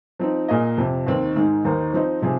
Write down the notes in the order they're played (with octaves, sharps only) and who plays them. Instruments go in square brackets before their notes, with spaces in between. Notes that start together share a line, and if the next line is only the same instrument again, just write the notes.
[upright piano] F3 C4 D#4
A#2 A#3 G#4 D#5
F2 C3 F3
D#2 D#3 C4
G#2 D#3 G#3
D#2 D#3 A#3 D#4 C5
F3 C4 D#4 C5 D#5
C3 F3 C4 G#4